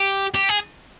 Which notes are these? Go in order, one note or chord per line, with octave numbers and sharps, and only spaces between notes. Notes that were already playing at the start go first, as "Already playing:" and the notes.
Already playing: G4
G4
G#4